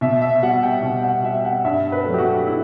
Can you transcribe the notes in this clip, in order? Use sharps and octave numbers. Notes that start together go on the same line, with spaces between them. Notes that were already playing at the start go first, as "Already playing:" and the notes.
B2 E5
E5
G3 F#5
G5
B2
F#5
G3 E5
F#5
G2 E5
B4
F#3 A3
G4
F#4
E4